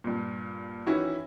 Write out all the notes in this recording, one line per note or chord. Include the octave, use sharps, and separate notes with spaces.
G2 A#2
D#3 E3 C#4 E4 F#4